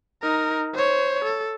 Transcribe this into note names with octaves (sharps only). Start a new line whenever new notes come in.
D#4 A#4
C5 C#5
A4